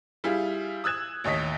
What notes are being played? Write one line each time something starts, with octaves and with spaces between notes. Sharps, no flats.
G3 E4 F4 G#4
D#6 E6 F#6 G#6 E7
A1 D#2 C#5 D#5 B6